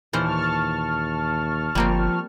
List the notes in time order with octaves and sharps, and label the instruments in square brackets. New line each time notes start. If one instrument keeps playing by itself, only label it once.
[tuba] D#2 [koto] A#2 E3 C5 [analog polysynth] A5 C#6 F6
[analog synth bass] G1 [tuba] F3 [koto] G3 A#3 C4